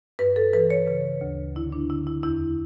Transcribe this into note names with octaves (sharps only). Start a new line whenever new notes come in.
G2 B4
A4
E3 B4
C#5
C#3 B4
D2
D3 E4
D4
D3 E4
E4
E2 E4